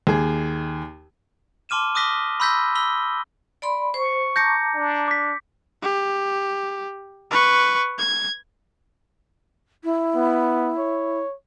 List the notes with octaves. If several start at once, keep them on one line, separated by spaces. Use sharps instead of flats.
D#2 G#4
A5 C6 D6 F6 D#7 E7
D6 D#6 F#6 A#6 B6 G7
B5 C6 E6 G6 A#6 B6
B5 E6 B6 G7
D5 B5 C6
C5 C#6
A5 A#5 D6 G6 A#6 C#7
D4
D6 B6
G4
B4 C#6
G#6
E4
B3
C#5